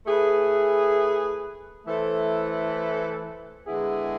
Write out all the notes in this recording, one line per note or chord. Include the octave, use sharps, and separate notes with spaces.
A3 E4 G#4 B4
E3 A3 E4 A4 C5
D3 G#3 B3 E4 G#4